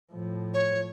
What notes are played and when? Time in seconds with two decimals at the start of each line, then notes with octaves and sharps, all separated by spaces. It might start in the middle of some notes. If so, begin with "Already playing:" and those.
0.12 A2 F3
0.54 C#5